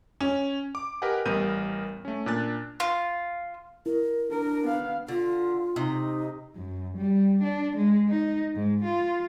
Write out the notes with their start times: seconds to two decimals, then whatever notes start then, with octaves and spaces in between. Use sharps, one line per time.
0.20 C#4
0.75 D6
1.02 G4 A#4 B4 D#5 F#5 G#5
1.26 A1 G3 B3 A#4 G6 D#7
2.05 A3 C#4
2.26 A#2 D4 F#6 A6
2.80 F4
3.86 E4 A#4
4.31 D4 A#4
4.63 B3 F5
5.08 D3 F4
5.76 C3 D#4 D#5
6.55 F#2
6.97 G3
7.43 D4
7.77 G#3
8.08 D#4
8.55 G#2
8.84 F4